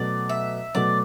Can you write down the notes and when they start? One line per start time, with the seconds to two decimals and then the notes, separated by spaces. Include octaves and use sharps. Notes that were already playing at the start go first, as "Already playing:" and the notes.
Already playing: B2 F#3 A3 D5
0.29 E5
0.74 B2 F#3 A3 D5